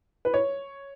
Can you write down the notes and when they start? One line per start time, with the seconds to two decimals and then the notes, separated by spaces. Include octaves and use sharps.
0.25 B4
0.34 C#5